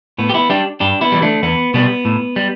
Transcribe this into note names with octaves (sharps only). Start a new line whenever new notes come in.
A2 B3
G4
B3 E4
G3 D4 G4
G2 D4 G4
B3 E4
E3 G3
A3 D4
E2 B3
B2 G3 B3
A2
G3